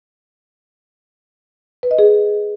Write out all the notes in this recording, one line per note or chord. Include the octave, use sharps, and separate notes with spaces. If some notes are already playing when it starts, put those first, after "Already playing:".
B4
D#5
G#4